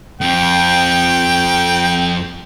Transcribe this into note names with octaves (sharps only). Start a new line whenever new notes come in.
F2 G5